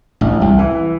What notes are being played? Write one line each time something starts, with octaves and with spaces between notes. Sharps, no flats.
A1
C2
E3